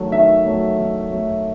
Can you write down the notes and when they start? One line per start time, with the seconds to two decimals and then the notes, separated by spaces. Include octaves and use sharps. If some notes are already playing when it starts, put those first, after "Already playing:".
Already playing: D#3 F#3 A3
0.12 D#3 E5
0.46 F#3 A3
0.79 D#3
1.11 F#3 A3